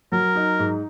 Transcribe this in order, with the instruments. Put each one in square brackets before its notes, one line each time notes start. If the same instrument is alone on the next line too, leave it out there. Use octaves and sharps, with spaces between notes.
[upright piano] F#3 [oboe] A#4
[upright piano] D#4
G#2